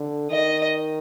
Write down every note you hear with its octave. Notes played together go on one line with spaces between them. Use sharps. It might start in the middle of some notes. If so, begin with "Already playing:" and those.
Already playing: D3
D#3 D#5